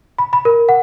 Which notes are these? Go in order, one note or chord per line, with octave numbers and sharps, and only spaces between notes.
B5
B5
A#4
F#5